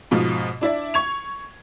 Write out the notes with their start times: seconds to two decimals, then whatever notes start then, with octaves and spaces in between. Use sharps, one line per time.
0.11 G#2 B2 F3
0.61 D4 E4 D5 E5
0.94 C#6 G#6 F7